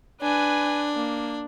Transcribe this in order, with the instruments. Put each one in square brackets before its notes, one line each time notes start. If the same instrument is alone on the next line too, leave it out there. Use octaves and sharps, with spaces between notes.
[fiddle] D4 [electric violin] B4 G#5
[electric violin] A#3